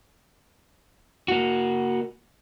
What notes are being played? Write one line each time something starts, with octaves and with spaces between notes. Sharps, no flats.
A#3 F#4